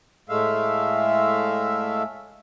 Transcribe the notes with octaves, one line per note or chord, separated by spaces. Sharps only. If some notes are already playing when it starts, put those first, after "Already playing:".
A2 G#3 A3 E5 F5